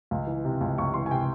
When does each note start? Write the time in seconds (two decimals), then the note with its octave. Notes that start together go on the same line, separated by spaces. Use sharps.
0.11 C#2
0.27 E3
0.45 C3
0.61 C#2
0.78 C#2 C#6
0.94 E3 C6
1.06 G#5
1.11 C3 G5